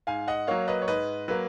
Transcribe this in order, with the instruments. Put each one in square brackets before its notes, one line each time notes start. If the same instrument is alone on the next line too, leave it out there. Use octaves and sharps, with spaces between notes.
[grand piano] G#2 F5 G#5
D#5 F#5
F#3 A#3 C#5 F5
B4 D#5
C#5
G#2 B4 D#5
F#3 A#3 B4